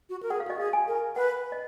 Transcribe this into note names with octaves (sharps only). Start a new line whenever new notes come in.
F#4
A#4
G#4 F#5
F5
F#4 D#5
G#4 F5
G#5
A#4
B4 F#5
D#5